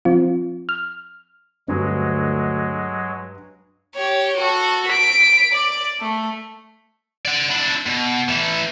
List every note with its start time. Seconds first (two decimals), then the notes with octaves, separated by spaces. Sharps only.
0.05 F3 C4 F4
0.69 F6
1.68 D2 G2 F#3 G#3 F#4
3.94 G4 C#5
4.36 F#4 A4
4.87 B6 D7
5.52 D5
6.00 A3
7.25 D5 F#5
7.50 D4 E4
7.86 B2
8.29 E3 A3